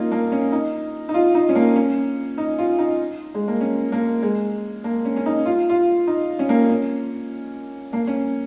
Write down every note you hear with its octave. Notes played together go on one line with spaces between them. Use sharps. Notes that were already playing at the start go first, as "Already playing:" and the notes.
Already playing: A#3 C#4 D#4 F4
A#3
C#4
D#4
D#4
F4
D#4
C#4
A#3
C#4
D#4
F4
D#4
G#3
A#3
C#4
A#3
G#3
A#3
C#4
C#4
D#4
F4
F4
D#4
C#4
A#3
C#4
A#3
C#4